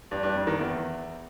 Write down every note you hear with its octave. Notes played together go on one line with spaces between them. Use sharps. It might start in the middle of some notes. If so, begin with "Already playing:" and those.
G2
G2
F2
D#3
E2